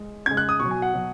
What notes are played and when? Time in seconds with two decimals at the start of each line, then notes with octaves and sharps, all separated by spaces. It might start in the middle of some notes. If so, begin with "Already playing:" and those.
Already playing: G#3
0.26 C#3 G#3 G#6
0.37 F#6
0.49 D#6
0.60 B2 F#3 C#6
0.71 G#5
0.82 F#5
0.94 B2 F#3